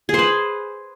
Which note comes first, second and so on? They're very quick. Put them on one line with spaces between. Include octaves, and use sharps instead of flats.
G#4 C5 B4